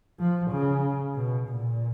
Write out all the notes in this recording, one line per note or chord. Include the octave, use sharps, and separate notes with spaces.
F3
C#3
B2
A#2